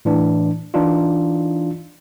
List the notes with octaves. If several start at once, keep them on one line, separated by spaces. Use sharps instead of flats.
A2 E3 D4
E3 D4 D#4 F4